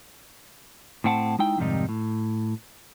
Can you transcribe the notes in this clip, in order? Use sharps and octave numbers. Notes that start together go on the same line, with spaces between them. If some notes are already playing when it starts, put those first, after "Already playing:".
A2 A3 C4 F#5 A5
G#3 D#4 E4 G5
F2 G#2 C3 D#3 G3 D#4
A2